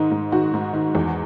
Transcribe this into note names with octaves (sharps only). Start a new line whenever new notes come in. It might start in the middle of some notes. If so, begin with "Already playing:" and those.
Already playing: G#2 D#3 D#4
G#2
D#3 F#4
G#2
D#3
E2